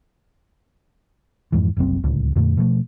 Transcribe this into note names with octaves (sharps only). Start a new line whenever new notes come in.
F2 G#2 E3
F#1 C2 F#2 C4
D1 C#2
F2 A#2 D3 A3
B2 F3 G3 A3